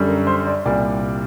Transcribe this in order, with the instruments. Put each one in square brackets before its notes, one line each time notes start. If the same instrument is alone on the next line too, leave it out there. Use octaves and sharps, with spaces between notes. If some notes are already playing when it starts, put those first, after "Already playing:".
Already playing: [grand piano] F#2 D3 G3
A#4
C5
D5
C2 A#2 G3 D5